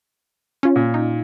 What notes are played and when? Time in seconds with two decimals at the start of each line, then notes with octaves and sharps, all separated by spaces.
0.63 C#4 F4
0.76 A#2
0.94 D#4